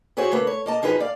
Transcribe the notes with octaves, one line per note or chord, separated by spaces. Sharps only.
E4 F#4 G#4 C5 C#5
C#3 A3 A#3 B4
C#5
A#3 D#5 A5
F#2 F3 D#4 G#4 B4
D5 F5